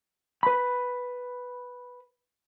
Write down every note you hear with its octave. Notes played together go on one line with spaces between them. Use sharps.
B4 B5